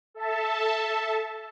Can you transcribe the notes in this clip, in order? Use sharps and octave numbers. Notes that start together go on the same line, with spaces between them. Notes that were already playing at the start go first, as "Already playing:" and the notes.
A4 E5 A5